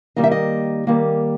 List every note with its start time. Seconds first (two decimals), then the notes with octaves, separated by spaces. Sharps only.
0.16 D#3 G3 A#3 D#5
0.24 E5
0.31 D#5
0.87 D#3 G3 A#3